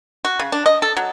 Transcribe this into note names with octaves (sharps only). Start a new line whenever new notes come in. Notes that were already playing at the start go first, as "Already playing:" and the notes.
F#4
C#3
D4
D#5
A4
F#3